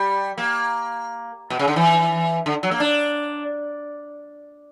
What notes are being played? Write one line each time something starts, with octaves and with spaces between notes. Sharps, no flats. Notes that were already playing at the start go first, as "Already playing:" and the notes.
Already playing: G3
A#3
B2
C#3
D3
E3
D3
F#3
A#3
D4